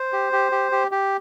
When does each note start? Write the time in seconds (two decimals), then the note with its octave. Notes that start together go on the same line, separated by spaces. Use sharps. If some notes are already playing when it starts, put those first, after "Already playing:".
Already playing: C5
0.13 G4
0.32 G4
0.52 G4
0.72 G4
0.91 G4